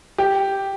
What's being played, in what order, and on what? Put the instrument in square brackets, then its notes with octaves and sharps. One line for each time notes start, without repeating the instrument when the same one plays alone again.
[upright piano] G4